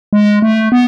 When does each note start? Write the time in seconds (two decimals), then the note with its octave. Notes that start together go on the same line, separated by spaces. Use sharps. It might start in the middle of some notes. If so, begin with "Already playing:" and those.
0.13 G#3
0.42 A3
0.72 B3